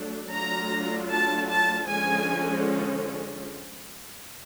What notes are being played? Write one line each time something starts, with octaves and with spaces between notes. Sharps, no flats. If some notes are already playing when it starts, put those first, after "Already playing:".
Already playing: F#3 A3 D4
F#3 A3 D4 F4 A#5
A5
A5
D3 F3 G#3 C#4 G#5